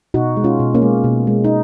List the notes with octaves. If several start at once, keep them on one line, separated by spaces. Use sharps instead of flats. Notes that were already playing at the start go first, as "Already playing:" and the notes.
B2 D#4 F#4
G#3
C#4 F4
B2
A#3 C#4
G#3
B2
G#3
D#4